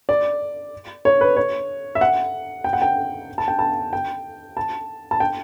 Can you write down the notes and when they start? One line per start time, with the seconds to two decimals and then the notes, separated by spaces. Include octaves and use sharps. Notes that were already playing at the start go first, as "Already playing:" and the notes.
0.09 D5
1.05 C#5
1.21 B4
1.36 C#5
1.95 E5
2.01 F#5
2.64 G5
2.73 F#5
2.82 G5
3.38 A5
3.48 G5
3.59 A5
3.93 G5
4.57 A5
5.11 A5
5.20 G5